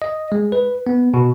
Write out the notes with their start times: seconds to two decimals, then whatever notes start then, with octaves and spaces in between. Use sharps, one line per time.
0.02 D#5
0.32 G#3
0.52 B4
0.87 B3
1.14 B2